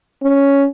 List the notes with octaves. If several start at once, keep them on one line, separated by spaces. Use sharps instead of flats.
C#4